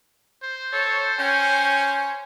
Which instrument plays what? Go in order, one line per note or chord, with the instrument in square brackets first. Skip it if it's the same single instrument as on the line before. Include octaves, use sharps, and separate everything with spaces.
[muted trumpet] C5
[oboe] A4 [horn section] C#5
[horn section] C#4 G#5 [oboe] G5